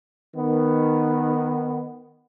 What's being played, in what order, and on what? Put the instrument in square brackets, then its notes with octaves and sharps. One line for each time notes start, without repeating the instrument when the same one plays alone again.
[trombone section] D#3 B3